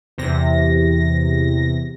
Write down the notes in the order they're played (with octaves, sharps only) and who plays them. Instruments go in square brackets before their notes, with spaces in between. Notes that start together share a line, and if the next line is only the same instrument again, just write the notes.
[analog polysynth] E2 C3 A#6